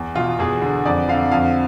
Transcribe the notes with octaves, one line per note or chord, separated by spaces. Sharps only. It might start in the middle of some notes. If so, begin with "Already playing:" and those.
Already playing: E2
B2 F4
E2 G#4
D3
F2 D5
D3 F5
F2 F5